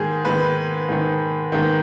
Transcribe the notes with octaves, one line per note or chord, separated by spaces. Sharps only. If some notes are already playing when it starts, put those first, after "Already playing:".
Already playing: G#2 D#3 G#4
G#2 D#3 B4
G#2 D#3
G#2 D#3